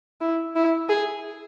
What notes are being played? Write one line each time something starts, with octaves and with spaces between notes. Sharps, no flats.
E4
E4
G#4